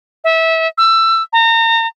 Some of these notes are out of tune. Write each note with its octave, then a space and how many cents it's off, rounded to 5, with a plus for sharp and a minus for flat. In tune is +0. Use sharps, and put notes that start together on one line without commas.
E5 -25
E6 +20
A#5 -35